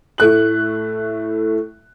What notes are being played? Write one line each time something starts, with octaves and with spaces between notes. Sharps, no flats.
A2 A3 F#6 F#7